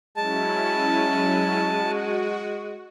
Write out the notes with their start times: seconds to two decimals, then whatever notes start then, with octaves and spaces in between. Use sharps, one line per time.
0.17 F#3 G#3 C#4 E4 A5
1.64 F#4